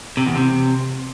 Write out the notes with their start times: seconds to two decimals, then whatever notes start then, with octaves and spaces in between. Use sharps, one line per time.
0.17 C3
0.26 E2
0.36 C3